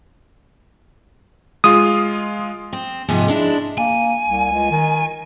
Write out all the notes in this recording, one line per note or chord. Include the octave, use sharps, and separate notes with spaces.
G#3 F4 D#6
C4
G#2 C3 F3 B3 D#4 G#4
G#3 D4 E4
A#3 G#5
C2
C#2
D#3